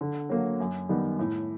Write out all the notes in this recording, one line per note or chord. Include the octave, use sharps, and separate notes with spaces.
D3
F#3 A#3
F#2
D#3 G3 B3
A2